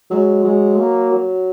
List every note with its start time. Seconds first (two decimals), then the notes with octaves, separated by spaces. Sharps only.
0.10 F#3 G#3
0.44 F#3 G#3
0.78 A#3
1.12 F#3